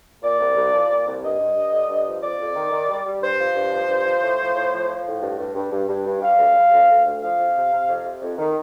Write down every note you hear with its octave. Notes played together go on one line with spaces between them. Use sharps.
A#2 D5
C2
C2
F3
A#2
C2
G2 D#5
G2
G2
D3
G2
F3
F2 D5
F2
D#3
D#3
G3
G3
G2 C5
F3
G2
F3
G2
F3
A2
F3
A2
F3
F3
A2
G2
G2
G2
G2
G2
G2
G3 F5
D2
G3
D2
D2
D2
F3 F5
F2
C3
C3
F2
C3
F2
D#3